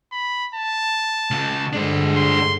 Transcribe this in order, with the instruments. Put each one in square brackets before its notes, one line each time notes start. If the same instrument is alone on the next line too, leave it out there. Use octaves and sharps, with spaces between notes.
[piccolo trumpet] B5
A5
[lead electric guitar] C#2 C#3
[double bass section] G2 D3 G#3 [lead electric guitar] D4 C5
[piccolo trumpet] C6